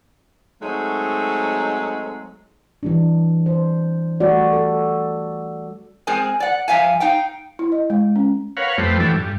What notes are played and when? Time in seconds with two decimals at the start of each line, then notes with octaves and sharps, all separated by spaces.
0.62 F#3 G#3 A3 C4 D#4
2.83 E3 G3 D4
3.46 C5
4.20 G3 A3 F#4 D5
4.53 A4
6.07 G#3 C4 G#4 A#4 G#5
6.40 D5 F#5
6.68 G2 F3 E5 F5 G#5
7.00 D#4 F5 G5
7.59 E4
7.72 D#5
7.90 G#3
8.16 C#4
8.57 A#4 B4 C#5 F5 F#5
8.78 F2 G3 A3 B4 C5
9.00 E3 F#3 G3 D4 A4
9.16 G2